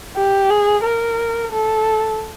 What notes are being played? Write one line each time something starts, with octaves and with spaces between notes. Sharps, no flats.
G4
G#4
A#4
A4